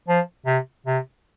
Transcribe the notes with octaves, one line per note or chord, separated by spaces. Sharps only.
F3
C3
C3